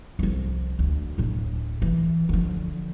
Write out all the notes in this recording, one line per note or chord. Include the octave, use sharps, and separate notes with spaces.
C2 F3
D2
D1 A2
E3
D3 F3